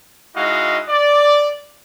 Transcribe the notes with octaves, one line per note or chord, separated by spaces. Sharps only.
G#3 D#4 E4 F#4 D#5 F5
D5